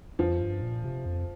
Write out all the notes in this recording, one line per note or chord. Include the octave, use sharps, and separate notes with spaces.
F2 F3
G2
A#2
C3
F2